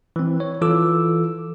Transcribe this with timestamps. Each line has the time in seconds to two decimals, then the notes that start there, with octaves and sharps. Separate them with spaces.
0.16 E3 C4
0.40 C#5
0.62 E3 F4 A4 D6 E6